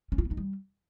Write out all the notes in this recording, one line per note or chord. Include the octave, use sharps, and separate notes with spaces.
C#4
F4
B3
D#4
G3